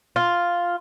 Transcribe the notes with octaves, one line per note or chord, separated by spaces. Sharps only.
F4